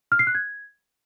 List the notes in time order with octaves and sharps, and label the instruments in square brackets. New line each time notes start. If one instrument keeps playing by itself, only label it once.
[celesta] F6
C7
F#6
G#6